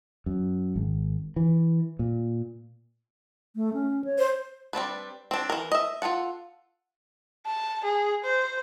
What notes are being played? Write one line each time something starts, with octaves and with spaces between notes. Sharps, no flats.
F#2
G#1
E3
A#2
A3
C#4
C#5
C5
G3 C4 D4 B4
C4 D4
E3 A#4
D#5 E5
F4 G#4 A4 F#5
A5
G#4
C5